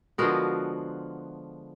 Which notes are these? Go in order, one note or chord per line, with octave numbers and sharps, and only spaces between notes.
D3 F3 G#3 B3 F#4 A#4